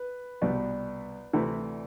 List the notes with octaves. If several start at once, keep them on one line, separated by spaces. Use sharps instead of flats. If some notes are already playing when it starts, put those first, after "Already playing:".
Already playing: B4
C2 B2 G3 B3 D5
D2 C3 E3 A3 E4